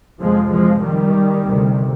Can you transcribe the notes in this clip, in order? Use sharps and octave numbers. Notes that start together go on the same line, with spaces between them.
F2 C3 F3 G#3
F3 G#3
D#3 G3
D2 C3